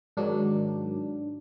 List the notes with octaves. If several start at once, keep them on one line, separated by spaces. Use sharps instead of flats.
G#2 D#3 F#3 D4